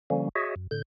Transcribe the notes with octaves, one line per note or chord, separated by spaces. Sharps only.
D3 F3 G3 A#3 C#4
F#4 G#4 C#5 D#5 E5
F#2
A2 D3 G6